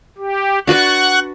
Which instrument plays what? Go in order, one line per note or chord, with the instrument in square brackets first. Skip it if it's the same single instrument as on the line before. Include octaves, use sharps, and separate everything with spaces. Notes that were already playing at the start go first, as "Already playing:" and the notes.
[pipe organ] G4
[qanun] D4 F#4 B4 [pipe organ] F#5 C#6 F#6